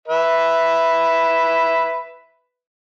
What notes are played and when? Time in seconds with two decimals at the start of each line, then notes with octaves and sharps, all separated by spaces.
0.08 B4 E5